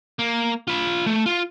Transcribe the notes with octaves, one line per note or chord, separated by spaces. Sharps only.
A#3
F4 B5
A3
F4